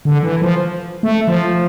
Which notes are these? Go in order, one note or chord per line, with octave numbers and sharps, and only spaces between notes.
D3
E3
F3
A3
F3